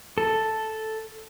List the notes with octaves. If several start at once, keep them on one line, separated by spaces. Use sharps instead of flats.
A4